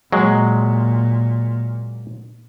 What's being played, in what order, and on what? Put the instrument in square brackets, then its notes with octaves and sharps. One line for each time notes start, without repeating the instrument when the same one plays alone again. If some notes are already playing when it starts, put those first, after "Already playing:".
[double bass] A#2 [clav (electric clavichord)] F#3 G#3